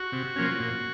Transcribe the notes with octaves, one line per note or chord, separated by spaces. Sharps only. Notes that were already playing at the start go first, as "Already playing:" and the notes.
Already playing: F#4
C3
F3 A#3 C#4
A#2